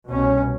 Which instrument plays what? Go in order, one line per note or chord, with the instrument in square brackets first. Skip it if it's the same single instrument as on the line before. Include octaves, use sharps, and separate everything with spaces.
[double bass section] C2 B2 C#4